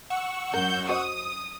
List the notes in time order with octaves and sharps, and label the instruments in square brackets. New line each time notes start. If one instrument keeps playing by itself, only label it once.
[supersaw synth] F#5 C#6 E6
[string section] F#2 G6 [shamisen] A#4
[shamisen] F#4 C5 D#5 [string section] D#6